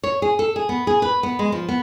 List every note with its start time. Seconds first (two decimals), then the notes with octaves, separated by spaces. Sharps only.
0.03 C#5
0.22 G#4
0.39 A4
0.56 G#4
0.69 B3
0.87 G#4
1.02 B4
1.23 B3
1.39 G#3
1.52 F3
1.69 B3